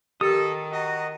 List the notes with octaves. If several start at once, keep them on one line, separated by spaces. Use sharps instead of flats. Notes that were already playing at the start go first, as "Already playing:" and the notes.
D#3 G4 A4 D#6
F#4 D#5 A#5